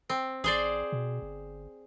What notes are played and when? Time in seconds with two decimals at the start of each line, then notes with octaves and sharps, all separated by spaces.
0.10 C4
0.44 A1 G#4 C5 D5
0.92 B2
1.22 G1